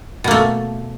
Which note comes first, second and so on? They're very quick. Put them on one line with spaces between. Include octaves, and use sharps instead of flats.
B2 A#3 A3